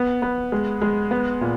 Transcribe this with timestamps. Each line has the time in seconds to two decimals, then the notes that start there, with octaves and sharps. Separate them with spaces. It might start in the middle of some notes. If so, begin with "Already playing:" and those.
Already playing: B3
0.22 B3
0.52 G#3
0.82 G#3
1.11 B3
1.41 A#2